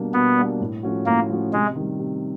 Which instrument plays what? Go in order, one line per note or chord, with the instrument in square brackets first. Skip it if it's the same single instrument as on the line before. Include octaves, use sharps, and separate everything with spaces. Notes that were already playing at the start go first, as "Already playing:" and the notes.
Already playing: [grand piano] B2 G3 A#3 D4
[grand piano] B2 [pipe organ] B3
[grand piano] G3 A#3 D4
A2
F3 A3 C#4 F#4
[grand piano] A2 [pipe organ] A#3
[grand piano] F3 A3 C#4 F#4
[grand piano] C3 [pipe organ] G#3
[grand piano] D#3 G3
C3